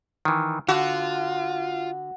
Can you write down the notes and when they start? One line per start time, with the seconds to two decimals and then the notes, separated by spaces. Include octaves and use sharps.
0.25 D#3 E3
0.69 D3 F4 F#4